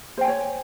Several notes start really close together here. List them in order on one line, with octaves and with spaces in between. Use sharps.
C5 G5 G#5 C#5